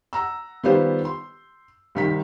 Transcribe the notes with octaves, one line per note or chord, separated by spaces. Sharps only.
F#5 A#5 E6
D#3 G3 B3 F4 G4 C5
C6
C2 D#3 B6